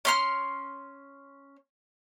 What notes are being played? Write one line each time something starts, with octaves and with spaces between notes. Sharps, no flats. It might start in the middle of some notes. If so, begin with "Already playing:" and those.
C#4 C6 F6